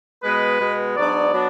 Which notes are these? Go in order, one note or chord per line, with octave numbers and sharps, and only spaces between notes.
B2 G#3 B3 B4
B2 G#3 B3
G#2 F#3 B3 D4 D5
F#3 B3 D4